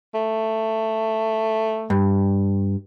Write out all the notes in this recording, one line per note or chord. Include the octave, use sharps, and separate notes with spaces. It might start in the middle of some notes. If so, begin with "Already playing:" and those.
A3
G2